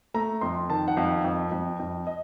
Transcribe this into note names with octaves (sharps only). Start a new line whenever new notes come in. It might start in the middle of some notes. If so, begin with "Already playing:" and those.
A3 A#5
F2 C6
D#3 A5
F#5
F2 F5
F2
F2
F2
D#5